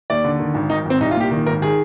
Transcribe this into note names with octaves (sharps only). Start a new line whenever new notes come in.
D#2 D5
D3
D#3
G#1
D#3 D#4
G#1 C4
C2 D#4
F4
A#2 G4
D#3
G#1 A#4
D#3 G#4